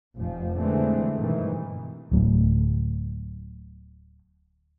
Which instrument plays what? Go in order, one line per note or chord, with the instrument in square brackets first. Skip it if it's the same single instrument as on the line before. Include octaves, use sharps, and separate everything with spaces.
[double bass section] F1 F3
D3 E3 G#3 A3 C4
G2 B2 D#3 E3
[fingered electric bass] D1 F#3 A3